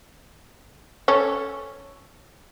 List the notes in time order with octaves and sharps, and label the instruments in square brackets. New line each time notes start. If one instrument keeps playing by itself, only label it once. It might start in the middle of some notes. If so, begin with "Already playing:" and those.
[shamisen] C#4 A4